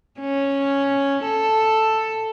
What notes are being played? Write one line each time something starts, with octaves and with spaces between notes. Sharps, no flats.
C#4
A4